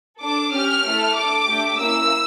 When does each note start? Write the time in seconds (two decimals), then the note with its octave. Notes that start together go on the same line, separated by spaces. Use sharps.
0.21 D4 A4 D6
0.53 C#4 G4 F6
0.85 A3 E4 A4
1.16 D4 A4 D6
1.47 A3 D4 G4
1.79 A#3 C#4 E4 E6